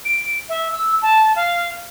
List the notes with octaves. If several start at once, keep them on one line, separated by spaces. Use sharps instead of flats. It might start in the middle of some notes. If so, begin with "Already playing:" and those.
D7
E5
E6
A5
F5